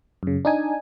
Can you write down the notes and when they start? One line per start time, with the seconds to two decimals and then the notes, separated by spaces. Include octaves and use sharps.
0.23 F#2 C#3
0.45 D4 D#4 G#5